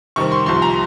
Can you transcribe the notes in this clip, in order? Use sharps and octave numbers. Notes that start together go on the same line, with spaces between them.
C3 D#3 G3 C4 C#6
C6
C2 C3 F3 C6
A#5